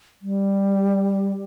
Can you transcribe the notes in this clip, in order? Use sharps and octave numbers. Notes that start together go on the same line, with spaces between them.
G3